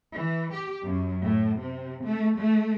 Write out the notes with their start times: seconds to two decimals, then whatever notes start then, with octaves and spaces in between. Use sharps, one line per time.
0.13 E3
0.53 G4
0.85 F#2
1.23 A2
1.60 C3
2.04 A3
2.35 A3